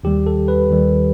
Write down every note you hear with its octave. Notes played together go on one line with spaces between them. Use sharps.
D#2 D#3 G3 G4
A4
B4
D#2 D#3 G3